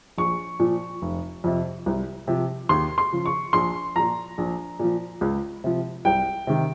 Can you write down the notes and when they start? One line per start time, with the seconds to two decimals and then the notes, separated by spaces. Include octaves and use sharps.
0.18 A#1 C#6
0.59 A#2 F3
1.02 F1
1.44 F2 C3
1.86 C2
2.28 C3 F3
2.69 D#2 C6
2.98 C6
3.12 C#3 F3
3.26 C#6
3.53 A#1 C6
3.95 A#2 F3 A#5
4.38 A#1
4.79 A#2 F3
5.21 C#2
5.64 C3 F3
6.05 C2 G5
6.47 C3 D#3